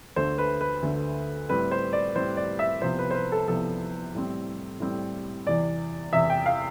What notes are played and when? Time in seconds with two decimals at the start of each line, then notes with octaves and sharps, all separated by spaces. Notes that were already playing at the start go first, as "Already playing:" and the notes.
0.16 D2 D3 A3 C5
0.38 B4
0.61 B4
0.82 D2 D3 A3
1.49 A2 G3 C4 B4
1.71 C5
1.93 D5
2.15 A2 G3 C4 C5
2.37 D5
2.59 E5
2.81 C2 C3 F3 B3 C5
2.99 B4
3.11 C5
3.15 B4
3.32 A4
3.48 C2 C3 F3 B3 A4
4.14 A2 G3 C4
4.80 A2 G3 C4
5.47 E2 C3 E3 D5
6.13 E2 C3 E3 E5
6.30 G5
6.46 F5